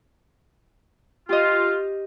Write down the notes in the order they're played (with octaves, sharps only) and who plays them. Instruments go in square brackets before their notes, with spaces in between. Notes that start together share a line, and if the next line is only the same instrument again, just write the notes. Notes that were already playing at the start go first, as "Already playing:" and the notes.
[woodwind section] F4 [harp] G4 D#5